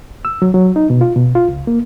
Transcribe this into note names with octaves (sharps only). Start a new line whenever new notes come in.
E6
F#3
F#3
D#4
B2
F4
B2
F4
C#2
A#3